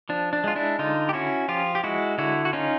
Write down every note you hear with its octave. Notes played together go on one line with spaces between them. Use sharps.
F3 D4
D4
G#3 F4
D4 E4
D3 D#4 F4
G4
C#4 E4 F#4
F3 F4 G4
G4
G#3 E4 F#4
D3 E4 F#4
F#4
C#4 D#4 F4